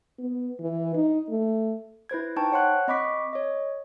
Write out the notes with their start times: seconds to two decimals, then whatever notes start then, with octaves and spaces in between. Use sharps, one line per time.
0.19 B3
0.60 E3
0.95 D#4
1.29 A3
2.09 E4 B4 C5 G#6
2.36 D#4 C5 G5 A5 C#6
2.52 C#5 F#5 C6 F#6
2.88 C4 D#5 B5 C#6 D6 B6
3.33 C#5 D#5